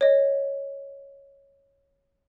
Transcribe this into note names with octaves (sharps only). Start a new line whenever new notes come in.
C#5 D#5